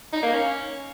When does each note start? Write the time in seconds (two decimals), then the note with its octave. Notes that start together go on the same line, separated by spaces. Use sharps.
0.13 D#4
0.23 A#3
0.33 C#4